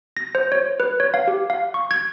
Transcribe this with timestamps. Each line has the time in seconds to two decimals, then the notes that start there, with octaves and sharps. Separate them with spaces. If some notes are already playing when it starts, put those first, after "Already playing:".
0.17 A#6
0.35 C5
0.52 C#5
0.80 B4
1.00 C#5
1.14 F5
1.27 G4
1.50 F5
1.74 C#6
1.91 G#6